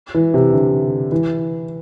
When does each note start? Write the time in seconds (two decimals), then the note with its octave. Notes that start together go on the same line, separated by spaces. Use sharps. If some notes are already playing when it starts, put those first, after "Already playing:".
0.14 E3
0.34 C3
0.54 D3
1.12 E3